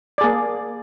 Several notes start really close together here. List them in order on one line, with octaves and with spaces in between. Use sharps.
D5 G#4 A#3